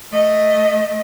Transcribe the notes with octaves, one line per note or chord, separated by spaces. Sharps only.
A3 D#5